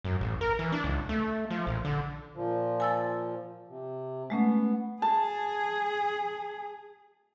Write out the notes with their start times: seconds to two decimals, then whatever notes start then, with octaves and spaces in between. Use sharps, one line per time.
0.05 F#2
0.21 A1
0.41 A#4
0.59 E3
0.72 D4
0.84 C#2
1.09 A3
1.50 F3
1.67 A#1
1.85 D3
2.34 A#2 F3
2.80 G#5 E6 A6
3.68 C3
4.30 G#3 A3 B3 C#4
5.02 G#4 A5